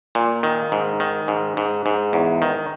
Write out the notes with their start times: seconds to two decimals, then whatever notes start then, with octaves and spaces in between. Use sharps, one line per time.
0.15 A#2
0.43 D#3
0.72 G#2
1.00 D#3
1.28 G#2
1.57 G#2
1.86 G#2
2.13 E2
2.42 D#3